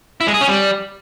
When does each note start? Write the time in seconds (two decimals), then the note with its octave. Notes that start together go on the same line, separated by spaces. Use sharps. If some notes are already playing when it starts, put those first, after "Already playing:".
0.21 E4
0.27 G#3
0.34 G#4
0.41 C#4
0.48 G3